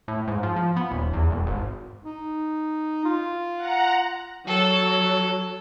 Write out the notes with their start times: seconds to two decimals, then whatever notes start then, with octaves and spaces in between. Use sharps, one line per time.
0.08 A2
0.28 G#2
0.43 F3
0.56 F3
0.76 B3
0.91 D#1
1.13 E2
1.31 E1
1.46 G#1
2.04 D#4
3.05 F4
3.56 F#5 A#5
4.47 F#3 A4